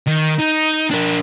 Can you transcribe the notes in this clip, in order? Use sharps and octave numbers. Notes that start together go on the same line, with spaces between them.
D#3
D#4
D4 A#4